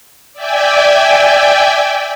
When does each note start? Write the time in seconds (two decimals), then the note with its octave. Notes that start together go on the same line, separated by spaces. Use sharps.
0.33 D5 E5 G5 G#5